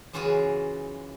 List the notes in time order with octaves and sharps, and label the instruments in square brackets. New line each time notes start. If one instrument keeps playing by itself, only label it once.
[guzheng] F#2 C#3 E3 F4 F#4 G#4